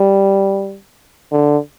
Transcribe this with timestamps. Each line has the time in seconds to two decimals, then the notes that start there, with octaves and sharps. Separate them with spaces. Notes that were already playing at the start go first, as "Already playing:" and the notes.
Already playing: G3
1.32 D3